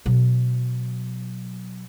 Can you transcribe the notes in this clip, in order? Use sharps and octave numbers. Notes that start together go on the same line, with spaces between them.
B2 F#3